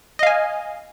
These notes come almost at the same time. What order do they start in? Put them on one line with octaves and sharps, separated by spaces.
D#5 F5 G#5